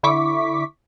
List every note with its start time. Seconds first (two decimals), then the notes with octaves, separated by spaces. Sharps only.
0.03 D3 E4 C#6 D6 B6